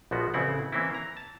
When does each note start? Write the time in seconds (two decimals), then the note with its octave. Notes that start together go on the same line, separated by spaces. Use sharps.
0.11 A#1 B2 F3 B3 F#4
0.34 A1 C#3 B3 C4 E4 F#5
0.72 E3 A#3 C4 C#4 E4
0.94 A#5
1.17 A5